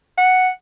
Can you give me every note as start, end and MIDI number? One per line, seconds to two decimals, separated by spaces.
0.18 0.48 78